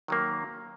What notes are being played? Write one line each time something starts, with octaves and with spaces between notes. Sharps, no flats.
D#3 F#3 A#3